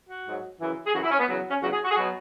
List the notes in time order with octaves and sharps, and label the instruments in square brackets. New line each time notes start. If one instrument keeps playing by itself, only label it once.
[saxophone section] F#4
G#2 F#3
F#2 C#3 E3
G#4
F#2 C#3 E3 F#4
E4
C#4
B3
E2 C#3 F#3
C#4
E2 C#3 F#3 F#4
G#4
F#4
G#4
B2 F#3 F#4